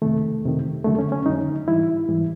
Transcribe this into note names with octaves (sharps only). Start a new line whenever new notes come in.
F2 C3 D#3 A3
F2 C3 D#3
F2 D3 F#3 A3
C#4
C#4
F2 D3 F#3 D#4
G#2 E3 G3 E4
G#2 E3 G3